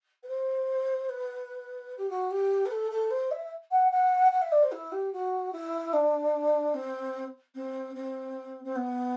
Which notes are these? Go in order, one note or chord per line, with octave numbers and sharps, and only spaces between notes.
B4
C5
B4
G4
F#4
G4
B4
A4
A4
C5
E5
F#5
F#5
F#5
E5
D5
C5
E4
G4
F#4
E4
D4
C4
C4
C4
C4
B3